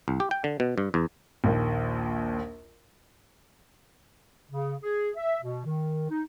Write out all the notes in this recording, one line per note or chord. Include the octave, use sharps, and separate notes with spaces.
C2
G4
G5
D3
B2
G2
E2
A#1 D#2
C#3
G#4
E5
B2
D#3
D#4